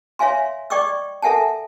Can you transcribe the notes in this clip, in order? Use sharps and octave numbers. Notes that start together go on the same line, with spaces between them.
C#5 E5 F5 G#5 C6
D5 D#5 G5 C#6 D6 E6
A4 A#4 E5 F#5 G#5 A5